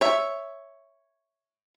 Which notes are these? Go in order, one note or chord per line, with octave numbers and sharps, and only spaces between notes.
C#5 E5